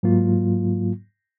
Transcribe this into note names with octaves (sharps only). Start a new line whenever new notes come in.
G#2 F#3 A#3 F4